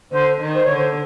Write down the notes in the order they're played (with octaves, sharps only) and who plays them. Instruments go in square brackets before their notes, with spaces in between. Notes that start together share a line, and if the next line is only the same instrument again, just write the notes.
[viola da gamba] D3 [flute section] C5
[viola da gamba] D#3
[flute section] C5
[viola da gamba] D3 [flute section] C#5
[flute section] C5